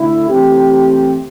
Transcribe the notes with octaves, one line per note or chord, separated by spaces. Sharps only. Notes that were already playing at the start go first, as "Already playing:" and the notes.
Already playing: D3 A3 E4
E3 A3 C4 G4